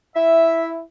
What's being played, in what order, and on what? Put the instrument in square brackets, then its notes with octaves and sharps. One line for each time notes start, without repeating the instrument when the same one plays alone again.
[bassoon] E4 [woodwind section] E5